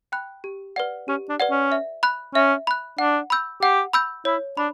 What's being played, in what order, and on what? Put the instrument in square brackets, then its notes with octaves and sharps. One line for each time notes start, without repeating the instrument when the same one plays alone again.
[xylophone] G5 B5 F#6
G4
B4 D5 F#5
[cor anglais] C#4 [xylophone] G4
[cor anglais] D4
[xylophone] B4 D5 F#5
[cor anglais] C#4
[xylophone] E5
B5 F#6
[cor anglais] C#4 [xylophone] E5
[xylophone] B5 F#6
[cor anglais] D4 [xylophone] F#5
[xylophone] B5 E6 G6
[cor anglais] G4 [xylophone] F#5
[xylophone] B5 E6 G6
[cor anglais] E4 [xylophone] C#5
[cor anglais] D4 [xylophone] B5